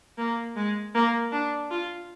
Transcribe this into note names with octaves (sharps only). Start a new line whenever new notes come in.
A#3
G#3
A#3
D4
F4